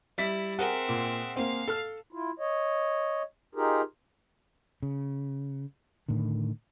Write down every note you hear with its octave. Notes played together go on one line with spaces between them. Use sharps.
G3 E4 E5 B6
C4 G#4 A#4 E5 F#5
A#2
A#3 C4 F5
A4 A5 F6
E4 F4
C#5 D#5
D#4 F4 G4 G#4 A#4
C#3
A2 D3 D#3